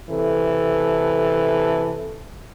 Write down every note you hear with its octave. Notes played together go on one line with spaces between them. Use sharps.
C3 E3 A4